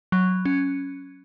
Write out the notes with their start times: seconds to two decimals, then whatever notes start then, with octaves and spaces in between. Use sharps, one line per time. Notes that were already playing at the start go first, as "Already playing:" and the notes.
0.12 F#3
0.45 C#4